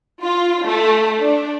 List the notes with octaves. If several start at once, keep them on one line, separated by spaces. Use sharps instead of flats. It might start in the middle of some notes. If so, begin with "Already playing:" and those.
F4
A3
D4